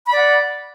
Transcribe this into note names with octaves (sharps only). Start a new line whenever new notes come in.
D5 F#5 B5